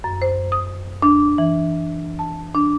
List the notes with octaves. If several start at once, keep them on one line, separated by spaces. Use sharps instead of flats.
F#2
C5
D#6
D4
E3
A5
D4